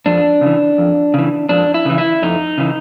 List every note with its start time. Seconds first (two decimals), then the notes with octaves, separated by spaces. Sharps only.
0.06 F2 D4
0.41 C#3 E3
0.78 F2
1.14 C#3 E3
1.49 F2 D4
1.74 E4
1.85 C#3 E3
1.98 E4
2.22 F2 D#4
2.58 C#3 E3